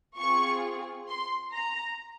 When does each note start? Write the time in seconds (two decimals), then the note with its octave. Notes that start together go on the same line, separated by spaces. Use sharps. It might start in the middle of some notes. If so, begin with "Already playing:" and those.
0.18 C4 F4 G#4 C#6
1.08 C6
1.53 A#5